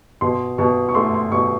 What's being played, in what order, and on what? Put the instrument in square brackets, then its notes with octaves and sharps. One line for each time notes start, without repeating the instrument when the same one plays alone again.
[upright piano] B2 C6
B2 C#6
C#6
A3 C6
C6
B2 C#6